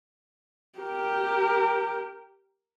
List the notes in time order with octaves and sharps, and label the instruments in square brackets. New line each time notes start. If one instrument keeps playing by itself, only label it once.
[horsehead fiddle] G4 A#4